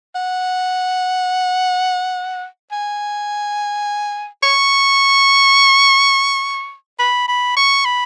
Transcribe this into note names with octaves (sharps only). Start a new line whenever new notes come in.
F#5
G#5
C#6
B5
B5
C#6
B5